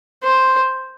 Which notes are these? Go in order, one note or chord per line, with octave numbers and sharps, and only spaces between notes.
C5